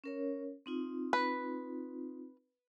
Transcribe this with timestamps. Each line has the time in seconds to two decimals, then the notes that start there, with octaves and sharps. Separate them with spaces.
0.04 C#4 A#4 C#5
0.66 C4 D#4 F4
1.13 B4